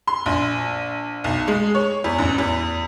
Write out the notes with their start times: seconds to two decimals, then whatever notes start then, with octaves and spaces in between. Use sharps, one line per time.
0.07 C6
0.26 A#1
1.24 B1
1.48 G#3
1.75 C#5
2.04 E2
2.18 A1
2.38 E2